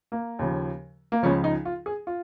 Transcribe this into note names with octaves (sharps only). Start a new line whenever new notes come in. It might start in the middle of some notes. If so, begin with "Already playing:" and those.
A#3
D#2 C#3 F3
A#3
C#2 C#3 F3 C#4
D#4
F4
G#4
F4